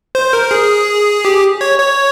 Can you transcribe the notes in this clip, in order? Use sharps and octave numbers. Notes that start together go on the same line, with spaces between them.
C5
A#4
G#4
G4
C#5
C#5